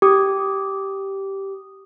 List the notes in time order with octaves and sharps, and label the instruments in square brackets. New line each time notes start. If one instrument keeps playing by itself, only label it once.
[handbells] G4 D#6